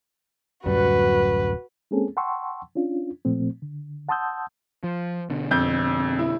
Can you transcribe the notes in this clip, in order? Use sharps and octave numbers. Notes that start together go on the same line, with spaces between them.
D1 F#2 G3 F#4 B4
G#3 A#3 C4 C#4 G#4 A4
F#5 G5 A5 C6 C#6 E6
C#4 D4 F4
A#2 F3 A3 C4
D3
F#5 A5 C6 D#6 E6 G6
F3
B2 D3
F2 G6
E4